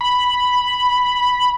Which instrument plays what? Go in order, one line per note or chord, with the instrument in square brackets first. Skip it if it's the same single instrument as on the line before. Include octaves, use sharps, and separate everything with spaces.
[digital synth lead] B5